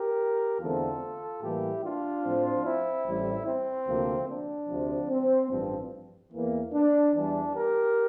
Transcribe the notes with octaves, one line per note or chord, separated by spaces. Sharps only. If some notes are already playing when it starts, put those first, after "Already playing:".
Already playing: G4 A#4
E2 D3 A3 C4 F4 A4
A2 E3 G3 A#3 E4 G4
D4 F4
A2 F3 C4
C4 E4
A1 A2 G3
C4
D2 C3 F3 A#3
D4
D2 C3 F3
C4
A1 G2 F3 C4
E2 E3 A#3
D4
E2 E3 G3 D4
G4 A#4